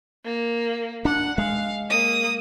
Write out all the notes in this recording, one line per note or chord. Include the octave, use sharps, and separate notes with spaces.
A#3
D4 F#5
G#3 F5
A#3 D#6